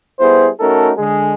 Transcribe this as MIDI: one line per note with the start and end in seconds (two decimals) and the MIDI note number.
0.20 0.48 55
0.20 0.48 59
0.20 0.48 64
0.20 0.48 68
0.20 0.48 72
0.60 0.91 57
0.60 0.91 61
0.60 0.91 63
0.60 0.91 66
0.60 0.91 69
0.60 0.91 70
0.97 1.34 50
0.97 1.34 56
0.97 1.34 68